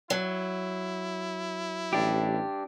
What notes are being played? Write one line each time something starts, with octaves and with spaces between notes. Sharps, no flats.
F#3 E4
A1 D4 G4